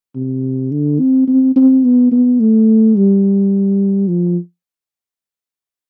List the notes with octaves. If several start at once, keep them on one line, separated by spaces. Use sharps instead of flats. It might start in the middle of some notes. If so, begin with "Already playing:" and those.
C3
D3
C4
C4
C4
B3
B3
A3
G3
F3